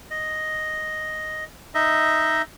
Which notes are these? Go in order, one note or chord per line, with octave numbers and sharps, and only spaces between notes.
D#5
D#4 D#5 E5